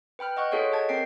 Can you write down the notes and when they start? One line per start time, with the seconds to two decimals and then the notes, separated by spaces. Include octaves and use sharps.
0.19 B4 G5 B5 F6
0.37 D#5 F#5 C#6 F#6
0.52 F4 G#4 A4 C#5 F5 C#6
0.72 D#5 A5 G#6
0.89 C4 A#4 G5 B6 C7 D7